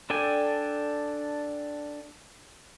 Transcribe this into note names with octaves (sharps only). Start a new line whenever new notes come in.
D4 A4 D5 G5 G#5